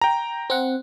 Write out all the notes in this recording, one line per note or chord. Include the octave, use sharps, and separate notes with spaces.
G5 A#5
C4 F#5